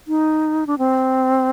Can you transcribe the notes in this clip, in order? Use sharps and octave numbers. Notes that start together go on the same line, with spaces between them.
D#4
D4
C4